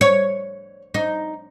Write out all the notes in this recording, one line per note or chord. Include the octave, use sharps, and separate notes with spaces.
C#5
D#4